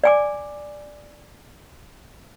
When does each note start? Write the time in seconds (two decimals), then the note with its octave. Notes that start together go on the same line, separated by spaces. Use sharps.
0.04 D5 G#5 D6